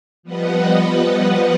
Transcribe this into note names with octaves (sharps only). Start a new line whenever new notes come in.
F3 G3 B3 B4 D#5 F#5